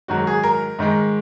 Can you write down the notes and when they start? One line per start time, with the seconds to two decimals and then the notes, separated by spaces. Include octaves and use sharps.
0.08 G#2 D#3 F#3 F#4
0.27 G#4
0.44 A#4
0.79 G#2 D#3 G#3